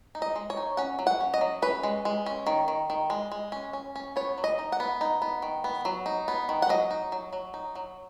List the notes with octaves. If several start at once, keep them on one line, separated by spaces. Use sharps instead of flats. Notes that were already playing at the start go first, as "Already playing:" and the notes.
D#4
D#5
G#3
C#5
D#4
C#4 F#5
F#3
F#5
C#4
D#5
F#3
C#4 B4
G#3
G#3
C#4
D#3
D#3
D#3
G#3
G#3
C#4
C#4
C#4
B3 C#5
F#3
D#5
D#4
F#5
B3
D#4
B3
D#3
B3
F#3
D#4
B3
D#3
F#5
F#3 D#5
D#4
F#3
F#3
D#4
F#3